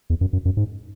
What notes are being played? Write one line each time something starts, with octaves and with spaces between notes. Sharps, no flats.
E2
F#2
F#2
F#2
G#2